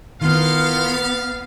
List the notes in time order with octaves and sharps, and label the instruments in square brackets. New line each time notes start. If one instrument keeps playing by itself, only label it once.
[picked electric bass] D#3 [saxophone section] E3 A#3 F4 [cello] B3 [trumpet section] F5